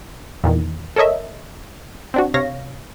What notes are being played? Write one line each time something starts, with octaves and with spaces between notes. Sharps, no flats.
E2 A#2 D#3
A4 A#4 C#5 D#5 E5
C4 D4 F#4
C3 C#5 F5 A#6